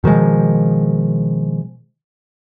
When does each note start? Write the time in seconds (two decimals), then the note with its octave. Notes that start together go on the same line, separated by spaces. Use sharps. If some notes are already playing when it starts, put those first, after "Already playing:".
0.04 B2 D#3 F3 G#3